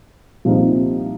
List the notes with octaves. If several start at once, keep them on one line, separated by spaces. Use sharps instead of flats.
C2 A#2 F3 C4 D#4